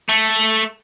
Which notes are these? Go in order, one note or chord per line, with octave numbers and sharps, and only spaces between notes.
A3